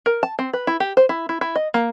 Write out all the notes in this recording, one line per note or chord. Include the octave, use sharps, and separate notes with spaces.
A#4
A5
C4
B4
E4
G4
C5
E4
E4
E4
D#5
A#3